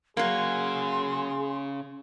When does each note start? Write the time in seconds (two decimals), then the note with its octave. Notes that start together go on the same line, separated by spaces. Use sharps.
0.17 C#3 F#3 A#3 G#4 G#5 C6